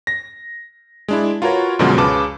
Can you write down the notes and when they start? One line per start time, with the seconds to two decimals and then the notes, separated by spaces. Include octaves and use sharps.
0.07 A#6
1.08 G#3 D4 E4
1.42 F4 F#4 A#4 B4 C#5
1.79 F#2 B2 D3 F3 G#3
1.98 C#2 C#3 B4 A5 D6